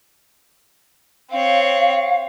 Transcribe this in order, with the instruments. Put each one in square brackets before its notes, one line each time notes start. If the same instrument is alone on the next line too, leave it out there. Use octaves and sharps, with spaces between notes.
[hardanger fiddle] C4 C#5 [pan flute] F5